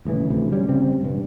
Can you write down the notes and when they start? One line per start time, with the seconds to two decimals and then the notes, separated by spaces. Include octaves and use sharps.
0.05 D#1 A1 C#3 E3
0.30 F1 D2 E3 C4
0.52 G3 C#4
0.69 C#3 G3 C4
1.01 E1 G2